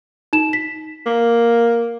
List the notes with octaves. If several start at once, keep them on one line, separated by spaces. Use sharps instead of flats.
D#4 E7
B6
A#3